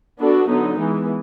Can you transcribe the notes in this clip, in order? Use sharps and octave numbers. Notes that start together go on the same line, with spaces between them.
B3 D4 F#4 A4
D3 F#3 B3 D#4
E3 G#3 B3